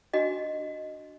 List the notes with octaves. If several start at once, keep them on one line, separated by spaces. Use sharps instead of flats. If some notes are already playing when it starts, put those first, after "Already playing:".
D4 F#4 D#5